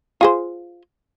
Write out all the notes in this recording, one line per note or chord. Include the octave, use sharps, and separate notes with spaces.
F4 G#4 C5